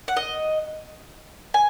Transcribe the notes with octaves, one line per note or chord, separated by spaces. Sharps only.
F#5
D#5
G#5